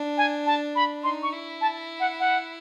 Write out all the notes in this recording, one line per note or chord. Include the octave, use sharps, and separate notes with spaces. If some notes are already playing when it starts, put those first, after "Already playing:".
Already playing: D4
G#5
A5
B5
D#4 C6
C#6
E4
A5
F#5
F#5